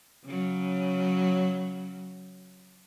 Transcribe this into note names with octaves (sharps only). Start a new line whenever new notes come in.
C#3 F#3